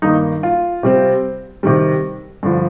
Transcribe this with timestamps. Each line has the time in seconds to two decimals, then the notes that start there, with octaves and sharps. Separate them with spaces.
0.02 G2 D#3 A#3 D#4
0.43 F4
0.83 C3 G3 C4
1.63 C3 D#3 G3
2.43 G2 D3 F3